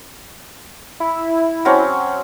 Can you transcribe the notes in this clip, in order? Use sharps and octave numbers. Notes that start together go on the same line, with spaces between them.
E4
F#3 C4 C#4